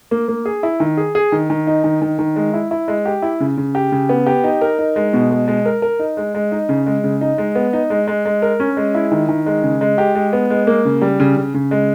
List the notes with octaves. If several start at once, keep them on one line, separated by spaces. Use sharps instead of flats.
A#3
A#3
G#4
E4
D#3
G#4
G#4
D#3
D#3
D#4
D#3
D#3
D#3
G#3
E4
E4
G#3
G4
E4
C#3
C#3
G4
C#3
B3
G4
D#4
A#4
D#4
G#3
B2
G#3
G#3
A#4
A#4
D#4
G#3
G#3
D#4
C#3
G#3
C#3
D#4
G#3
B3
D#4
G#3
G#3
G#3
A#4
C#4
G#3
E4
D#3
D#3
G#3
C#3
G#3
G4
G#3
B3
G#3
A#3
C#3
G3
C#3
C#3
C#3
G#3